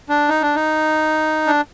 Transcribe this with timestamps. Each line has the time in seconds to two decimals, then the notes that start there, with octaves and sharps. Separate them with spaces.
0.09 D4
0.29 D#4
0.42 D4
0.55 D#4
1.47 D4